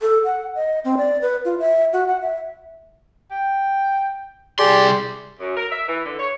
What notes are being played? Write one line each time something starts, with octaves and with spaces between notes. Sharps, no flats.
A4
F#5
D#5
C4
D5
B4
F4
E5
F#4
F#5
E5
G5
C2 G4 G#4 D5 C6
F#2
A#4
E5
E3
D3
C#5